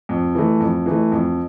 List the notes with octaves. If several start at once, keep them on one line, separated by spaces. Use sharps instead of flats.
F2
E3 A3
F2
E3 A3
F2